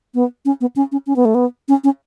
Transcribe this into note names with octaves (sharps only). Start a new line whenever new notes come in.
B3
C#4
B3
C#4
C#4
C#4
B3
A3
B3
C#4
C#4